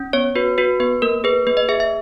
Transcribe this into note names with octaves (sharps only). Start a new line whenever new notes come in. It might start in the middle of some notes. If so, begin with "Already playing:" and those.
Already playing: C#4
B3 C#5
F#4 B4
F#4 B4
B3 B4
A#3 A#4
G#4 B4
A#3 B4
D#5
G#4 E5
E5